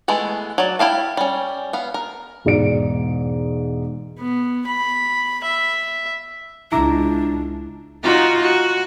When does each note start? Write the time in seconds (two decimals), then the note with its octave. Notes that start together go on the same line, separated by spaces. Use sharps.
0.08 E3 G#3 A3 B3
0.58 F#3 D5
0.79 E4 G4 F5 A5
1.17 G3 C#4
1.73 B3 F5
1.94 A#4
2.45 E1 G#2 D5 D7
4.19 B3
4.67 B5
5.44 E5
6.72 C#2 D4 E4 A#5 D6
8.03 D#4 F4 F#4
8.42 F#4